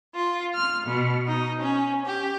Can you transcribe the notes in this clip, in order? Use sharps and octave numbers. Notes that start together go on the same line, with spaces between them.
F4
F6
B2
D#4
C#4
G4